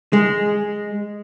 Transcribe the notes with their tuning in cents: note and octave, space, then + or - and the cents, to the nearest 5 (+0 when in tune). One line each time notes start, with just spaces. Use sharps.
G#3 -5